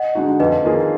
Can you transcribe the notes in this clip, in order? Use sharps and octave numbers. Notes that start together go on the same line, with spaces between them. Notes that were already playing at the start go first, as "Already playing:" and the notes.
Already playing: D#5 F#5
D3 G#3 D#4 F#4
F2 B4 D#5
D#3 A#3 F4 G#4